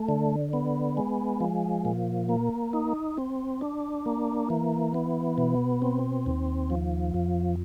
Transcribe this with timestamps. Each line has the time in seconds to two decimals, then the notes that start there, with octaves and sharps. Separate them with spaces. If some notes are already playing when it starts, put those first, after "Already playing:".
Already playing: A3
0.09 D3
0.53 B3
0.97 G#3
1.41 F3
1.85 A#2
2.29 A#3
2.73 D#4
3.18 C4
3.61 D4
4.06 A#3
4.50 E3
4.94 B3
5.38 B2
5.82 C4
6.26 D#2
6.70 F3
7.14 F2